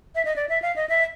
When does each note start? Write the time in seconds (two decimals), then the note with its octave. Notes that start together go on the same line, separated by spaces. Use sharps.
0.15 E5
0.25 D#5
0.36 D5
0.49 E5
0.62 F5
0.76 D#5
0.89 E5